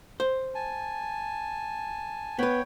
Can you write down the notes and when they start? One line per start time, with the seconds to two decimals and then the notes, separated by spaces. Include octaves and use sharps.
0.20 C5
0.55 G#5 A5
2.39 B3 B4 C#5 G5